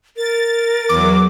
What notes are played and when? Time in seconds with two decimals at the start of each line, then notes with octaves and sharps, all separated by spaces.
0.17 A#4 A6
0.89 E2 F#3 D6